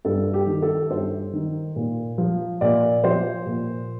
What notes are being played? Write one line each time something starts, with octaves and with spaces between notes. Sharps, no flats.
G2 A4
G4
D#3
A4
G2 C5
D#3
A#2
F3
A#2 D5
F3 C5
A#2